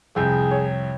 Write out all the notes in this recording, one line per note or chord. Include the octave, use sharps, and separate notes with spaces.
C2 F2 C3 E4 G#4 G5 G6
C#5